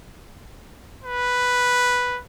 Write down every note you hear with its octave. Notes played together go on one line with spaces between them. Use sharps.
B4